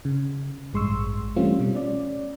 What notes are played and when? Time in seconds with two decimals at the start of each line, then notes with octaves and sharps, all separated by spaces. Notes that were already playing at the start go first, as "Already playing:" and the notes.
0.05 C#3
0.73 A1 G2 G#3 C6 C#6 E6
1.36 E3 G3 A3 C4 C#4 F4
1.60 B2 G3
1.75 C#4 D5